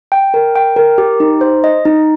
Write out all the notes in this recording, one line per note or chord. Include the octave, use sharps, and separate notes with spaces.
G5
A#4
G5
A#4
G4
D#4
C5
D#5
D#4